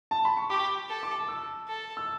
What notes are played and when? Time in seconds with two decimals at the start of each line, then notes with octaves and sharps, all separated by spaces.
0.11 A5
0.25 B5
0.37 C#6
0.50 G4 D6
0.89 A4
1.03 D6
1.28 E6
1.68 A4
1.97 E6